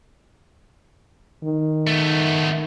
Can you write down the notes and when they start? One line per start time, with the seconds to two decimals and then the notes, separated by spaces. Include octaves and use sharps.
1.44 D#3
1.87 A3 B3